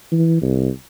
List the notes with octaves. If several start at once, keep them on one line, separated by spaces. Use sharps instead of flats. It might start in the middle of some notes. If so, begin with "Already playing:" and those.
E3
C2